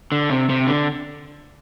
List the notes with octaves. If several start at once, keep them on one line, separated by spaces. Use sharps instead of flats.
D3
C3
C3
D3